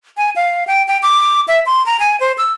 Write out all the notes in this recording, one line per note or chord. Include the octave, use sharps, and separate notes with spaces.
G#5
F5
G5
G5
D6
E5
C6
A#5
G#5
C5
E6